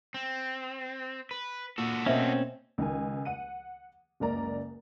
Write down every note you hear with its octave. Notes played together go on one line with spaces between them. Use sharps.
C4
B4
A#2 F#4 A4
B2 A#3 C4 C#4 C5 D#5 E5
C#2 D#3 G#5
F#5 D#7
F#1 C#2 A#4 D5 A#5